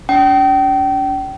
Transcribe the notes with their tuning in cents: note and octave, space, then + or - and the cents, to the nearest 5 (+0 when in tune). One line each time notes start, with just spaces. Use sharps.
D4 -45 G5 -30